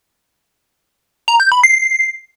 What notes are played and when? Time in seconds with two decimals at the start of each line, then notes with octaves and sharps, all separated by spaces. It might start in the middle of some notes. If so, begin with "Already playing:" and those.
1.28 A#5
1.40 G6
1.52 B5
1.64 C7